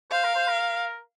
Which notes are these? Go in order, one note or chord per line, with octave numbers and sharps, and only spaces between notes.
C5 F5
A#4
C5
A#4